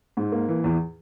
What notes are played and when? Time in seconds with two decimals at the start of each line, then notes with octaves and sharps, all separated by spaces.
0.17 G#2
0.32 A#3
0.49 E3
0.64 E2